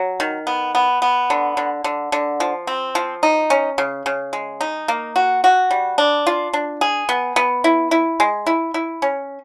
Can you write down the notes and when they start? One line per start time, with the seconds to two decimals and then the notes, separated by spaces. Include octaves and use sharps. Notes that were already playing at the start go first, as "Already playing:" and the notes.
Already playing: F#3
0.20 D#3
0.47 B3
0.75 B3
1.02 B3
1.30 D3
1.57 D3
1.84 D3
2.12 D3
2.40 F3
2.67 C4
2.95 F3
3.23 D#4
3.50 C#4
3.78 C#3
4.06 C#3
4.33 G#3
4.61 D#4
4.88 A#3
5.16 F#4
5.44 F#4
5.71 G3
5.98 D4
6.27 F4
6.53 D4
6.81 G#4
7.09 B3
7.36 B3
7.64 E4
7.91 E4
8.20 G#3
8.46 E4
8.74 E4
9.02 C#4